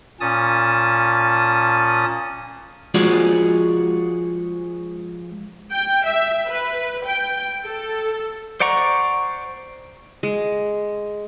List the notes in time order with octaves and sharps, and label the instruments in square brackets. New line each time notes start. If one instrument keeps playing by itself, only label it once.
[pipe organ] A#2 C#4 A5 D#6
[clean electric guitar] F3 G#3 F4 F#4 G#4 D5
[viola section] G5
E5
B4
G5
A4
[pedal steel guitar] C5 D5 F#5 A#5 C#6
[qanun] G#3